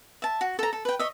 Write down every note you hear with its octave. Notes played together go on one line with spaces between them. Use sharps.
E5 A5
F#4
A4 A#5
A4
B4 G5
C#5 D#5 E5